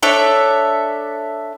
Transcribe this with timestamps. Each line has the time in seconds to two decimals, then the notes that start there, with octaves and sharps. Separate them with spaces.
0.03 D4 A4 C#5 E5